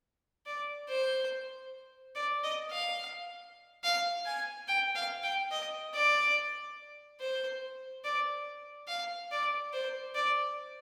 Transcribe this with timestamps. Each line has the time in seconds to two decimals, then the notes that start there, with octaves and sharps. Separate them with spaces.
0.46 D5
0.88 C5
2.15 D5
2.44 D#5
2.71 F5
3.84 F5
4.25 G#5
4.68 G5
4.95 F5
5.23 G5
5.51 D#5
5.94 D5
7.20 C5
8.04 D5
8.88 F5
9.31 D5
9.73 C5
10.14 D5